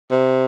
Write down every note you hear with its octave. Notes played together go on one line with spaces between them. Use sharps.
C3